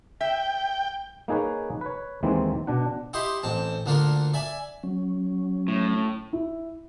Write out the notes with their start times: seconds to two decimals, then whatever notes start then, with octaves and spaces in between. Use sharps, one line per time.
0.21 E5 G5
1.28 A#3 D#4 G#4 B4 C#5
1.81 B4 C#5
2.23 D#2 E3 G#3 A#3 C4
2.67 B2 D4 F#5
3.13 E4 G4 D#5 C6 D6
3.43 A1 C4 A5
3.86 D2 D3 A#3 D4 F4 A#4
4.34 D5 E5 G#5
4.83 F#3 C#4
5.68 A2
6.33 E4